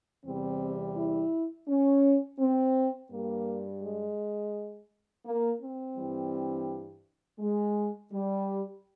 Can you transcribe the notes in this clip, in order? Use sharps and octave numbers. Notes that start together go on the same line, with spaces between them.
E2 C3 E3 G3 C4
E4
C#4
C4
G2 G3 A#3
G#3
A#3
C4
G2 E3 G3
G#3
G3